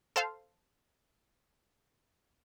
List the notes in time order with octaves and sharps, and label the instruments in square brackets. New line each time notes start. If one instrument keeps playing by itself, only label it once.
[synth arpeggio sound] A4 C5 F5